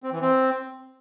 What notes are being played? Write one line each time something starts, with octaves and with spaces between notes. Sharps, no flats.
C4
E3
C4